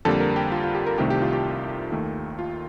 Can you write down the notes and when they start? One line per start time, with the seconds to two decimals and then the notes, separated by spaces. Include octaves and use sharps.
0.05 F2 D3 G3 A#3 A4
0.20 A#4
0.36 G4
0.52 F4
0.64 F4
0.75 G4
0.86 A#4
0.98 C2 C3 D#3 A3 G4
1.10 G4
1.22 F4
1.33 G4
1.92 D#2 D#3 A3
2.39 F4